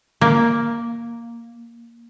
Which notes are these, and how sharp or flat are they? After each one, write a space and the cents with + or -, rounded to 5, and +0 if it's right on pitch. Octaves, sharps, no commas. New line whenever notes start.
A#3 +0